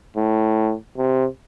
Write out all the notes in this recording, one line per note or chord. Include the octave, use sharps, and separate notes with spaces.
A2
C3